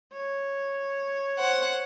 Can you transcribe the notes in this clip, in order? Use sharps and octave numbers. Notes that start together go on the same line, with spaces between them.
C#5
C5 F#5